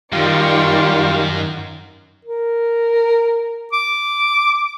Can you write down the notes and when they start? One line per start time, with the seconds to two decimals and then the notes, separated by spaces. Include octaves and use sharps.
0.13 F#2 D#3 G3 F4 D5 C6 C#6
2.25 A#4
3.72 D6